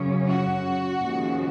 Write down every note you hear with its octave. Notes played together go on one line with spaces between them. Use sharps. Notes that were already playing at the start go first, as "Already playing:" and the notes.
Already playing: F#2 C#3 F#3 C#4
F#4
D#2 C#3 F3 G#3